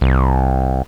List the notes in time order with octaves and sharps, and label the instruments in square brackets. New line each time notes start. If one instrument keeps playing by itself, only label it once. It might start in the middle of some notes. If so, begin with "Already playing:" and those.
[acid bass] C2